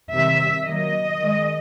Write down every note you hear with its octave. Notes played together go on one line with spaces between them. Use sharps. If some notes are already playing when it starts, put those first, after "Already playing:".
C3 D#3 G3 E5
D#3 F#3 A#3 D#5
D#3 G#3